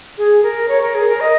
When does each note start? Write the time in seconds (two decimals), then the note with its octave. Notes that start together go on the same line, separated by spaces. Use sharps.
0.18 G#4
0.43 A#4
0.68 C#5
0.82 A#4
0.95 G#4
1.08 A#4
1.20 D#5